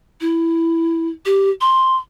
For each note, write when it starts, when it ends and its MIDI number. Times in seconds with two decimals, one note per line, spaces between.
0.21 1.08 64
1.26 1.50 67
1.61 1.96 84